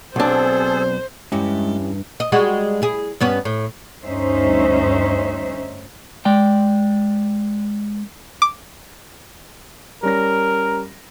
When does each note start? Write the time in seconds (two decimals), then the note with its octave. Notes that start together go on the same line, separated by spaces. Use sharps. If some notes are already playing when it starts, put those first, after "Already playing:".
0.16 B1 C4 D4 G#4 A4 C5
1.32 E2 G2 G#3 C#4 E4 G4
2.20 D#5
2.32 G3 G#3 F#4
2.82 E4 G#4
3.20 G2 B3 C#4
3.45 A2
4.03 D2 G2 C#4 D#4 C5 E5
6.25 G#3 D5 G5
8.42 D6
10.03 G3 C#4 A#4 A#6